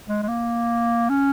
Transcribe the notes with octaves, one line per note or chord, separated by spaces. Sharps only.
G#3
G#3
A#3
C#4